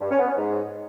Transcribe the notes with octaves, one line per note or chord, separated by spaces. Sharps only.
G2
C#4
B3
C#4
G#2